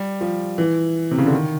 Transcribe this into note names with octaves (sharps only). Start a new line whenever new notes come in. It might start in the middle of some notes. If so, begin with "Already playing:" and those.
Already playing: G3
F3
E3
C3
C#3
D3
D#3